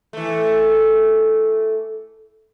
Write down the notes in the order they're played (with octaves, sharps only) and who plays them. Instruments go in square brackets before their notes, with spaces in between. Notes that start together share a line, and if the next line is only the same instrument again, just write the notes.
[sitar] E3 A3